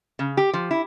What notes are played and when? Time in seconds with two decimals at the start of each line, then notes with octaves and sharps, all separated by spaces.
0.19 C#3
0.37 G4
0.53 F3
0.71 E4